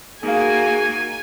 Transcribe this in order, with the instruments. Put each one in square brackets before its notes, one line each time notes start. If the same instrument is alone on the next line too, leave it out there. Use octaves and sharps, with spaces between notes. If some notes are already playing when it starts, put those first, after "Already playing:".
[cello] A#3 F#4 [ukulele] D#4 F5 [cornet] G#4 [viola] G#5